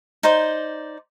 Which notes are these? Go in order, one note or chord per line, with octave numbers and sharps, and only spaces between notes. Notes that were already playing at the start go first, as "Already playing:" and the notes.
D#4 C5 D5